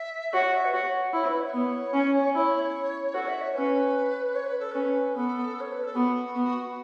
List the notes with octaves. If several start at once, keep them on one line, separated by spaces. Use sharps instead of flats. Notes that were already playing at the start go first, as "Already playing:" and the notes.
Already playing: E5
F#4 C#5
E5
B4
F#4 C#5
C#5
E4 C#5
B4
E5
C#5
B3
C#4
E4 C#5
F#4 A4
E5
C#5
C#4 B4
C#5
B4
A4
C#4 B4
B3 A4
C#5
B4
A4
B3 F#4
B3